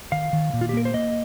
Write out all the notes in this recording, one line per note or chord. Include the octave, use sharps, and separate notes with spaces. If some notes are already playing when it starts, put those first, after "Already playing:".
D#3 F5
D#3
A#2
F4
G4
A#3 A#4
C5
A#3 D#5